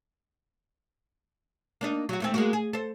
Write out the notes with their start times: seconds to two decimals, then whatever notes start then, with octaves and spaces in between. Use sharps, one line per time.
1.81 A#3 D4 D#4
2.09 F#3 F#4
2.20 D#2 A3 C4
2.34 G#3 A#3 F#4
2.53 G#4
2.73 A4 C5